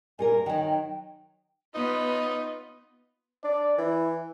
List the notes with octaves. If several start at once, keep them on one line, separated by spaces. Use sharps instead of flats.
A#2 A4 A#4 G#5
D#3 F#3 G5
G5
B3 D#4 F4 B4
D4 D5
E3 E4